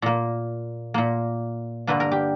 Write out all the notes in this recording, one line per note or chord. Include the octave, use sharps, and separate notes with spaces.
A#2 A#3
A#2 A#3
G2 D3 A#3 B4
A#4
G4